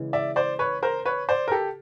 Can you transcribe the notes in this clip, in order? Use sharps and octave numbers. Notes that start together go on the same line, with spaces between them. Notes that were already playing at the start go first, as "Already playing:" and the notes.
Already playing: C#3 E3 G#3
D5 E5
C5 D5
B4 C#5
A#4 C5
B4 C#5
C5 D5
A#4
G4 A4